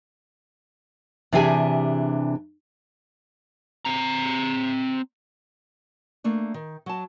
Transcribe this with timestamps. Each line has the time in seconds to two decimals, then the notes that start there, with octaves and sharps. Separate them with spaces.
1.33 C3 E3 D4 G4 G#4 G#5
3.85 C4 A#5
6.24 A3 A#3 D4
6.54 D#3
6.86 F#3 A5